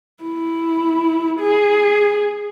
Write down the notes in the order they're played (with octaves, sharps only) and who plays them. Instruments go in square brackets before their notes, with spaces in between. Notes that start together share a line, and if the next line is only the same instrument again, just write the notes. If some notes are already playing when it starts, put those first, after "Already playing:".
[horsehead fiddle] E4
G#4